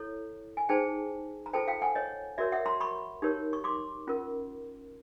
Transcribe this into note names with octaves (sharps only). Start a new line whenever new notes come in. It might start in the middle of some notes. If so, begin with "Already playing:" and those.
Already playing: E4 A4 C#5
G#5
D#4 G#4 C5 G5 A5
A#5
F4 A4 C5 G5 A5
F5 G5
F#5 G#5
C#5 D#5
F#4 A#4 C#5 D5 E5
E5 F#5
A#5 C6
B5 C#6
D#4 G4 A#4 C#5
C#6
C6 D6
C#4 F4 A#4